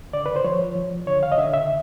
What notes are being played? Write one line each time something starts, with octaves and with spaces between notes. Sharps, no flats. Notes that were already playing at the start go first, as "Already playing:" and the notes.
D3 D5
B4
C5
F3 C#5
F3
D3 C#5
F5
D#5
D3 E5
E5